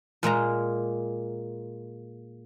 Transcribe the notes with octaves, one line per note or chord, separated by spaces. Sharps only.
A#2 G#3 A#3 A#5